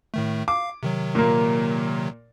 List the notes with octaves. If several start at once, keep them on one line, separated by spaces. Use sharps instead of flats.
A2 D#3 A3
F5 D6
C3 D#3 F#3
A#2 A#3